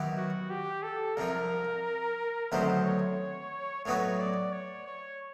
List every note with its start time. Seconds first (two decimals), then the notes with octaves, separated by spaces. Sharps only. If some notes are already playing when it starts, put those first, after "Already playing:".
Already playing: D#3 F#3 B3 E4 G4
0.17 F#4
0.50 G4
0.83 A4
1.17 C2 C3 F3 A#4
2.52 D2 C3 D#3 F#3 B3 C5
2.85 C#5
3.85 A2 F#3 B3 D#4 F#4 C#5
4.19 D5
4.53 C#5
4.86 C#5